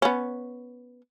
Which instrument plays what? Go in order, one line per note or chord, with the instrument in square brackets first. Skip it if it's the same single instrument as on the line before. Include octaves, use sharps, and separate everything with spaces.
[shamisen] B3 C#4